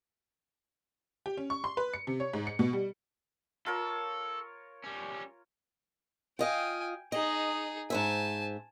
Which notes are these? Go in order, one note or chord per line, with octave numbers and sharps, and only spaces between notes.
G4
C#4
C#6
C6
B4
C#7
C3
C#5
G#2
C#7
B2
G3
F4 A4 A#4 C#5
G3 C#4
F4 D#5 F5 G5 G#5
D#4 G#4 D#5
G#2 C5 E5 G#5 A5